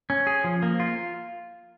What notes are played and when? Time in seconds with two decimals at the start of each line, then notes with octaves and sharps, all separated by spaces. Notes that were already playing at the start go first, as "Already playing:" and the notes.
0.10 C#4
0.27 G#4
0.44 F3
0.62 A#3
0.80 F4